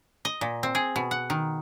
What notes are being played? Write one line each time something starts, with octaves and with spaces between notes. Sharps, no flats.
D#5
A#2
C4
G#4
B2
F#5
D#3